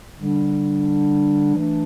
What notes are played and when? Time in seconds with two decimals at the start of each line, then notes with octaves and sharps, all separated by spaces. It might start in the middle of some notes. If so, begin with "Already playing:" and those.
0.20 D3 G3 D4
1.56 E3 A3 D4